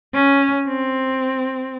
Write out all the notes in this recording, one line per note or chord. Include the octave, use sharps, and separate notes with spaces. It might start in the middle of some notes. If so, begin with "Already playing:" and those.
C#4
C4